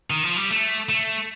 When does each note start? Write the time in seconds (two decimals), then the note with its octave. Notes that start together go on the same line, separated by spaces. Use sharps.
0.10 D#3
0.23 F3
0.37 G3
0.50 A3
0.89 A3